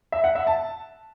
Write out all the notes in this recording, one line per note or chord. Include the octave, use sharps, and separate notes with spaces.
E5
F#5
E5
A5